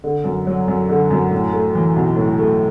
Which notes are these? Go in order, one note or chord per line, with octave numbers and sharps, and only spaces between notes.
D3
F#2
F#3
F#2
D3
F#2
A2
A3
E3
B1
A2
A3